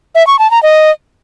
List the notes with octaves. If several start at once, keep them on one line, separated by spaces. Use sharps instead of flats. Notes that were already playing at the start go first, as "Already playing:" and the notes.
E5
C#6
A5
A#5
D#5